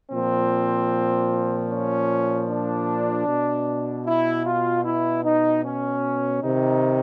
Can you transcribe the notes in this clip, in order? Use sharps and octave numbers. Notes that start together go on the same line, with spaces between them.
A#2 F3 C4
C#4
D4
B2
E4
F4
E4
D#4
C#4
C3 D#3 D#4